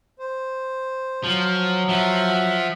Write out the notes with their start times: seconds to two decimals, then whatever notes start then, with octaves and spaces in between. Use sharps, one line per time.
0.19 C5
1.24 F3 F#3
1.89 F3 E5 F#5